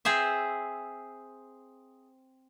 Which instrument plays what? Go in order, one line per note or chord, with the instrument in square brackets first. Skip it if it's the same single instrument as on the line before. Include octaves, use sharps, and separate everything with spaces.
[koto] C4 G#4 C5 E5